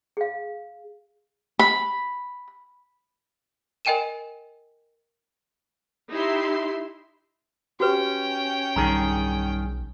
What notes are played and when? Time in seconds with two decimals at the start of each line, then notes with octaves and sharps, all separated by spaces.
0.17 G#4 F5
1.59 B5
3.85 A#4 D#5 G5 G#5 D#7 E7
6.11 D#4 E4 G4 E5 C6
7.80 C#4 F#4 G4 B4 G5
8.76 B1 G2 D#3 G#4 A#5